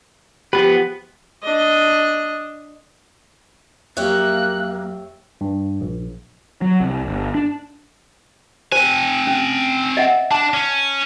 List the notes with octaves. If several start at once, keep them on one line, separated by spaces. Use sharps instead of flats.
F3 B3 G4 B4
D4 D#5
F2 F#3 A#3 G4 C#5 E5 F#6
G2
A#1
F#3
C2
G1
D4
C4 C5 G#5
C#4
D#5 E5 F#5
D4 A5
C#4